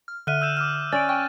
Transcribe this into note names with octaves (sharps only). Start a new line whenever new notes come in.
F6
D3 E5 F6 F#6 D#7
E6 G6 E7
D6 E6 F6
C#4 D5 A6 D7
G5 C#6